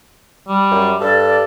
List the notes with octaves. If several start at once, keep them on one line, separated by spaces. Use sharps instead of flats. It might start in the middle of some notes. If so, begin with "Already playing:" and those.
G3
F#2
G2 A4 D5
D5